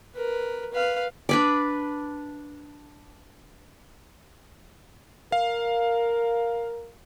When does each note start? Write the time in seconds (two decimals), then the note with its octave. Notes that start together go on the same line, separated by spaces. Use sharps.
0.15 A#4 B4
0.73 B4 F5
1.29 D4 B4 D5
5.32 A#4 F5